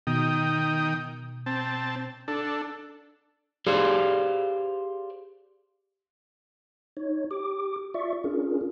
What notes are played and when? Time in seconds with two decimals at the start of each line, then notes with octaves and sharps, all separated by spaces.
0.07 B2 D#3 G5 D#6
1.46 C4 A5
2.28 D4 A4
3.67 G4 G#4 C5 D5 F5
6.97 D#4 C#5
7.31 G4 D6
7.94 F4 D5 E5 C#6
8.24 C#4 D4 F4 G#4 A#4